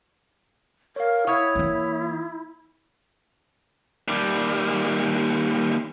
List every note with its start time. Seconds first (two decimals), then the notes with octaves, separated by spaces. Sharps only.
0.96 A#4 C#5 F5
1.27 E4 C#5 F#5 D#6 G#6
1.55 E3 A#3
4.08 D#2 G3